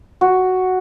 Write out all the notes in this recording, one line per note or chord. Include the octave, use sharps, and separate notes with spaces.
F#4